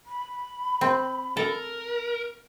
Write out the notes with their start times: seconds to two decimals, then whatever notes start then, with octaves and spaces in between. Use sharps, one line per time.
0.06 B5
0.81 C4
1.37 A4 A#4